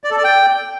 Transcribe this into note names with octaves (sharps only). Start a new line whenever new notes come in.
D5
A4
D5
G5